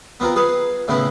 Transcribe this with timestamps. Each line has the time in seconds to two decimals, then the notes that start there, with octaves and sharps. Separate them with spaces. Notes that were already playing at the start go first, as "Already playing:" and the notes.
0.20 B3 C4 F4 A#4
0.36 G#4 B4 F5
0.88 A2 C#3 B3 E4